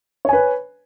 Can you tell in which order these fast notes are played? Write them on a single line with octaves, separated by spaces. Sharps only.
C#5 G#5 B4